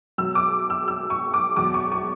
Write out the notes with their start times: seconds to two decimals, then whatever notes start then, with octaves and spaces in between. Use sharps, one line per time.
0.18 B2 F#3 E6
0.35 D6
0.70 E6
0.88 E6
1.10 C#6
1.34 D6
1.56 E2 B2 F#3 D6
1.74 C#6
1.92 C#6